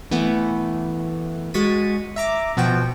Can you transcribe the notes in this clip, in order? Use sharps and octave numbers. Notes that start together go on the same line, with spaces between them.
E3 A3 B3
G#3 F#4 C#6 A6 B6 D#7
E5 A#5 D6
B2 F3 B3 F#4 G5